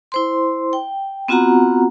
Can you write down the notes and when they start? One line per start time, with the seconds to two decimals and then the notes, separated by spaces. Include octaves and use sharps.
0.12 E4 C5 C6
0.73 G5
1.28 B3 C4 F4 F#4 F#5 A#5